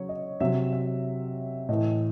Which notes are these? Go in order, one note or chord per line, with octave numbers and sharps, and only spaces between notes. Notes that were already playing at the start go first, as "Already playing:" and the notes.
Already playing: C#3 F#3 C#5
D#5
C3 F#3 E5
E5
A2 E3 D#5